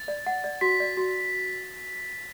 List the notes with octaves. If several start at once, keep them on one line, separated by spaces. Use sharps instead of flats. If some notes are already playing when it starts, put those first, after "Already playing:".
Already playing: A6
D5
F#5
D5
F#4 B6
D5
F#4